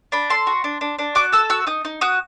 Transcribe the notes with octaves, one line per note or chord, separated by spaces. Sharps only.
D4 B5
A4 C6
F#4
D4
D4
D4
F#4 D6
A4 E6
F#4 E6
D#4 D#6
D#4
F#4 D#6